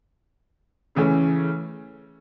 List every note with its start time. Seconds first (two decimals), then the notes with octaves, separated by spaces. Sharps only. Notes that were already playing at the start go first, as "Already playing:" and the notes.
0.95 C#3 E3 A3 C#4